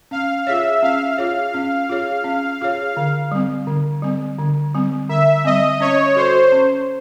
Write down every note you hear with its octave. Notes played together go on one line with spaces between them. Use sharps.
C#4 F5
F4 G#4 C#5 E5
C#4 F5
F4 G#4 C#5
C#4
F4 G#4 C#5
C#4
F4 G#4 C#5
D3
G3 C4
D3
G3 C4
D3
G3 C4
D3 E5
G3 C4 D#5
C#4 C#5
F#4 A4 C5
C#4